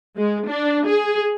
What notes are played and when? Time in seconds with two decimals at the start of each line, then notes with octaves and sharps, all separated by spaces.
0.16 G#3
0.48 D4
0.86 G#4